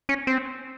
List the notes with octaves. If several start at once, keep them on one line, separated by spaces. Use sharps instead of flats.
C#4
C4